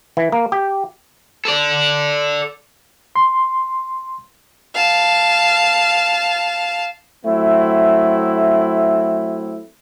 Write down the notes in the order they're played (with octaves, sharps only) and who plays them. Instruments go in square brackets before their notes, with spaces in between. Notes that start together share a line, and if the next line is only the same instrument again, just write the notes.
[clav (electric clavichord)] E3
A#3
G4
[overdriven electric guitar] A4 D5
[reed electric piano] C6
[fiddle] F5 A5
[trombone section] F#3 A3 C4 E4